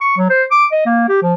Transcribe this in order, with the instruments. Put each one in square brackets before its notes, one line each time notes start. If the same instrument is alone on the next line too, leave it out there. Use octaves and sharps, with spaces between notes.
[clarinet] C#6
F#3
C5
D6
D#5
A#3
G4
F3